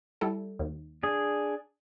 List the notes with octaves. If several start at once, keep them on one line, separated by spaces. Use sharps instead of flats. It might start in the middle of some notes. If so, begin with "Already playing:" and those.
G3 E4 A4
D#2
D4 G#4